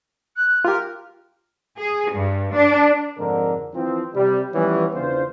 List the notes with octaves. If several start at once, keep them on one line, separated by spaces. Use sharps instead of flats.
F#6
F4 G4 A#4
G#4
G2
D4
F2 G#2 D3 A#4
E3 F3 C4
C3 G3
E3 F3 G3 B3 C#4
E2 C#3 E3 D4 F4 C5